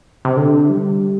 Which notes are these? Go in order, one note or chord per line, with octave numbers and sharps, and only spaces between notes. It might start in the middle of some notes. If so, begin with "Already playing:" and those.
C3
D3
G3